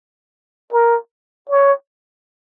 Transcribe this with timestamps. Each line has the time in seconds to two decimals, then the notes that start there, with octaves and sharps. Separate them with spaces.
0.73 A#4
1.49 C#5